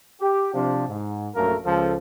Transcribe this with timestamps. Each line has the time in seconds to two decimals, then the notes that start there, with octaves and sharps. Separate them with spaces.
0.21 G4
0.54 C3 F3 D4
0.88 G#2
1.35 A#1 F#2 A3 A#3 A4 A#4
1.65 C#2 F3 A4